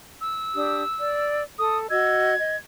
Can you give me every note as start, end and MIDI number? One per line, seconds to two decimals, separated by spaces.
0.21 1.42 88
0.54 0.83 62
0.54 0.83 67
0.54 0.83 87
0.99 1.43 74
1.58 1.90 69
1.58 1.78 87
1.90 2.35 66
1.90 2.35 75
1.90 2.35 88
1.90 2.57 92
2.38 2.56 75